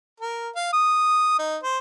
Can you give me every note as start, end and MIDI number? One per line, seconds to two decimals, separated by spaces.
0.20 0.49 70
0.55 0.71 77
0.73 1.36 87
1.39 1.57 63
1.63 1.78 72